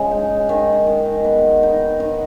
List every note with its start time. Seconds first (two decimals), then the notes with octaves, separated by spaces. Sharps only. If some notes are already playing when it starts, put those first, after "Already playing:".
Already playing: C#3 G#3
0.11 D#4
0.49 D#3
0.87 D#3
1.24 B3
1.63 D#4
2.00 D#3